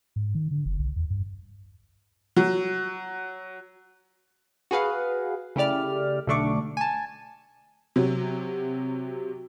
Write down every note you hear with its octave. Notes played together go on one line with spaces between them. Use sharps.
G#2
D#3
D3
F#1
B1
E2
G2
F#3
F#4 G#4 B4 F5 F#5
C#3 A3 E4 G4 D5 F6
B1 D3 A3 D4 C#6 D6
G#5 A5
C3 F#3